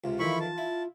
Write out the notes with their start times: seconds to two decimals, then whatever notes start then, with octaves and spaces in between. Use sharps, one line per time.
0.04 C#2 C3 F4
0.19 F2 D#3 E3 E4 B5 C#6
0.40 A5
0.58 E4